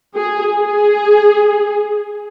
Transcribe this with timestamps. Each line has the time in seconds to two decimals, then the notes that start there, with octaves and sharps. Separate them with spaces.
0.15 G#4
0.57 G#4